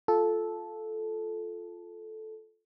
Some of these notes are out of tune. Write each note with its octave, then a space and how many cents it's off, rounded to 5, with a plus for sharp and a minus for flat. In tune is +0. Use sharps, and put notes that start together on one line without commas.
F4 +0 A4 -10